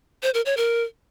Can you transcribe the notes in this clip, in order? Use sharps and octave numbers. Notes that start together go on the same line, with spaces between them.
C5
A#4
C#5
A#4